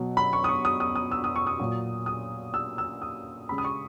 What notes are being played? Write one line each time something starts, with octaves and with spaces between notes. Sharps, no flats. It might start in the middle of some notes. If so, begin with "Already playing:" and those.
Already playing: B2 F#3
B5
C#6
D#6
C#6
D#6
D#6
D#6
E6
D#6
C#6
D#6
A#2 F#3
D#6
E6
E6
D#6
C#3 G#3 B5
D#6
C#6